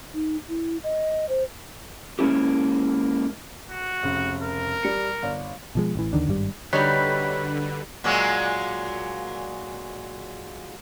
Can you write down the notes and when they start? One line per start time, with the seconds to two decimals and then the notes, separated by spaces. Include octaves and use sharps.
0.14 D#4
0.49 E4
0.84 D#5
1.29 C5
2.19 G#3 A#3 C#4 E4 G4
3.70 F#4
4.03 F1 C#3
4.42 A#4
4.83 G3 C#7
5.22 G1 D5
5.75 B2 F3 G#3
5.95 A1 E3
6.13 D#2 D3 D#3 D4
6.28 G#1 G2 G3
6.73 D3 G3 D#4 F#4 G4 B4 C#5 D#5
8.04 A#2 F#3 G#3